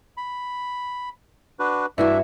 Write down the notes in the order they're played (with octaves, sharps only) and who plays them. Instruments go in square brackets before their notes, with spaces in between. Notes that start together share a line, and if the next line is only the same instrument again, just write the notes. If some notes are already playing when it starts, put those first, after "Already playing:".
[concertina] B5
D4 F#4 B4
[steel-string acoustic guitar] G2 E4 F#4 [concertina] D4 E5